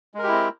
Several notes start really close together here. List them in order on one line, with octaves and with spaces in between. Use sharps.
G#3 A#4 G4 E4 C4